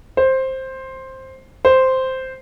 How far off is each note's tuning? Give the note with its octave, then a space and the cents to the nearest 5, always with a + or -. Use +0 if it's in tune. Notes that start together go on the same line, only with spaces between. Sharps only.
C5 +10
C5 -5